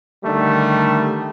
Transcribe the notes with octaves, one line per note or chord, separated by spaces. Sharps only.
D3 D#3 G3 A3